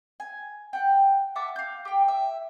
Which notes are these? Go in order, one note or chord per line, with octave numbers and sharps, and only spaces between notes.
G#5
F#5 G5
E5 F#5 A5 D6
F5 G6
G4 G5
E5